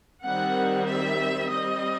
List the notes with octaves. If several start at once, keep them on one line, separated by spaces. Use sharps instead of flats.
D#3 G3 C4 F#5
E5
G3 C4 D#5